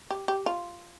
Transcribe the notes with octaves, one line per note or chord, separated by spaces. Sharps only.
G4
G4
F4